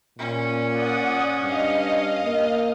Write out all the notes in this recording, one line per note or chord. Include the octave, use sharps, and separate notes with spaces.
A#2 C#4
D5 F#5 D#6
G2 D#5 F5
A#3